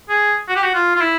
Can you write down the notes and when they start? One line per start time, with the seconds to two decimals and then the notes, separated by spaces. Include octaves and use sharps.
0.09 G#4
0.49 F#4
0.56 G4
0.63 F#4
0.75 F4
0.96 F4
1.00 E4